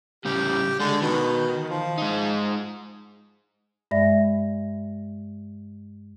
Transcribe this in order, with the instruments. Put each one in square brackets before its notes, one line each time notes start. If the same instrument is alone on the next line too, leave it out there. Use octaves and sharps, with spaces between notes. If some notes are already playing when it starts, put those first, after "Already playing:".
[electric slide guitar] A2 C#3 G3 [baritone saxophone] G4
[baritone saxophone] D3 [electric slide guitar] G#3
[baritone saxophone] B2 [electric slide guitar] D#3
[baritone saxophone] F3
[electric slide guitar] G#3 D#4
[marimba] G2 G#3 D5 E5 A#6